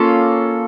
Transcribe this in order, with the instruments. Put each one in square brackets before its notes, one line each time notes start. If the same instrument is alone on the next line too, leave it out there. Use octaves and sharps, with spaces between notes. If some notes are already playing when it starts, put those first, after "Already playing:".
Already playing: [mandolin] A#3 C#4 F4 A4